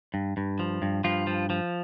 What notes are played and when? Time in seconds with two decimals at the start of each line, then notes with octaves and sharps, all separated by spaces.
0.14 G2
0.37 G2
0.59 F3
0.82 G2
1.04 G2 F3 F4
1.27 F3
1.50 F3